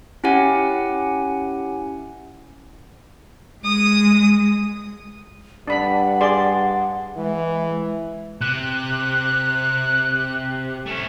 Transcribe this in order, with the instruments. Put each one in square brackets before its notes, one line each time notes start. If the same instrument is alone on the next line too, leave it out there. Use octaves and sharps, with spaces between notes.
[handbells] C#4 E4 G4 F#5 G#5
[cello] G#3 [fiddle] D#6
[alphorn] G2 [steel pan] D4 B5 [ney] F#5
[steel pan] G#4 D5 C6
[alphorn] E3 [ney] G#3
[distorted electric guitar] C3 [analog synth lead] F#6
[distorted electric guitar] A3 C#4